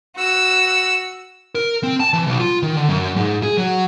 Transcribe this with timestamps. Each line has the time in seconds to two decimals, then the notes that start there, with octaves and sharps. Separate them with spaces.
0.16 F#4 E6
1.55 A#4
1.83 C4
2.00 A5
2.13 E3
2.27 B1
2.40 F4
2.63 D#3
2.77 D3
2.89 F#2
3.17 G#2
3.43 G#4
3.58 F#3